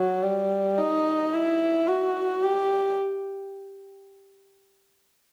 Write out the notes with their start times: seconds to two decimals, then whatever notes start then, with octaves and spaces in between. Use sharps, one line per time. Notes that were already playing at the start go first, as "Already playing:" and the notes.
Already playing: F#3
0.23 G3
0.78 D#4
1.33 E4
1.88 F#4
2.43 G4